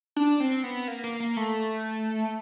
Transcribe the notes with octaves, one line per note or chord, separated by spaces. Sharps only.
D4
C4
B3
A#3
A#3
A#3
A3